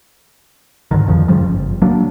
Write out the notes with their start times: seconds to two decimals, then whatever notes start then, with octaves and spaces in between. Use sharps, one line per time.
0.91 G#2 D3 D#3
1.07 A1 F2 D#3 F3
1.28 F#2 C#3 F3 G3
1.46 G1
1.82 F#3 A#3 D4